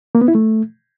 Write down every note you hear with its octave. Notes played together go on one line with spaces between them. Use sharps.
A#3
B3
E4
A3